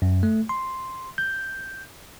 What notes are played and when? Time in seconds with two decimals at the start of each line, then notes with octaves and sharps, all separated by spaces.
0.02 F#2
0.23 A3
0.49 C6
1.18 G6